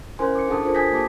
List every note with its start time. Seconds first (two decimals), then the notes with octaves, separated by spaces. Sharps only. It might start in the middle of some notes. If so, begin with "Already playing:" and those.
0.19 C#4 E4 A#4 C5 G#5 C6
0.35 D6 C#7
0.47 D4 G#4 A4 F#5 A5 D#6
0.63 D4 F4 A4 A#4 C5
0.75 G#5 D#6 G6 G#6 A#6 B6
0.92 A#3 G4 A5 D6